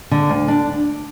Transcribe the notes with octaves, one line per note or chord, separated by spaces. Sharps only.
D3
D2
D4